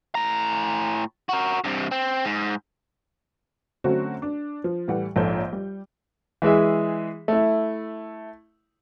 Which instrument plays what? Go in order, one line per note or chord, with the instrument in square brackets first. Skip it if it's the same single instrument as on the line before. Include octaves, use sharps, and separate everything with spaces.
[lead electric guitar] A2 A#5
F#4 A#4
G2 C3
C4
G#2
[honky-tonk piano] D3 F#3 A3 C4 C#4 F#4
D4
F3
A2 E3 G3 F#5
A#1 G#2 A4 C5 C#5 G6
G3
[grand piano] E3 G#3 G#4 E5
A3 E4